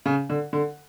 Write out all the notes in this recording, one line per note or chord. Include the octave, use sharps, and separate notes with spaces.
C#3
D3
D3